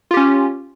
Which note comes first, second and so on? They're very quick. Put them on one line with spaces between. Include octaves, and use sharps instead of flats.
F4 G4 C#4